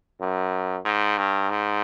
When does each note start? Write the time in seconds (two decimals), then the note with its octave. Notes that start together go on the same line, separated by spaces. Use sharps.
0.20 F#2
0.85 G#2
1.18 G2
1.50 G#2